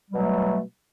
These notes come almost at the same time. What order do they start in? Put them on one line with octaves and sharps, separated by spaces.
G3 F#3 B2 A3